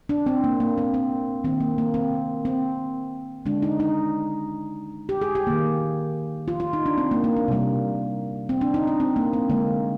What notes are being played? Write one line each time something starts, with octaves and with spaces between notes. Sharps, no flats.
D4
C4
A#3
A#3
C4
C4
D#3 A#3 C4
A#3
A#3
C4
C4
D3 G#3 D4
D#4
D#4
G4
G#4
G4
D#3 A#3
F4
F4
D#4
D4
C4
A#3
A#3
D4
C3 G3 A#3
C4
D4
D#4
D4
C4
A#3
C4
D3 G#3 A#3